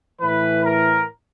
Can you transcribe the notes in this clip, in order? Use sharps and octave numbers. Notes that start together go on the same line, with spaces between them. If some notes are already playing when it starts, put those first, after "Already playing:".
A2 E3 B4
A#4